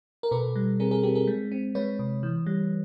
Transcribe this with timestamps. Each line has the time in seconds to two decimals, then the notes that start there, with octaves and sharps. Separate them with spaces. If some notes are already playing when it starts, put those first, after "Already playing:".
0.23 A#4
0.31 B2 A4 B4
0.56 G3
0.80 C4 G#4 A#4
0.91 G#4 A#4
1.03 C4 G4 A4
1.15 G#4 A#4
1.27 G#3
1.52 C4
1.75 G#3 B4 C#5
1.99 C3
2.23 E3
2.46 G3